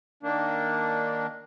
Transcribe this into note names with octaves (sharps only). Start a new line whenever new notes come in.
D#3 A#3 D4